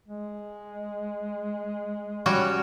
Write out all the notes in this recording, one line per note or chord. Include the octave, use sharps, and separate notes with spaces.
G#3
G3 C#4 F#4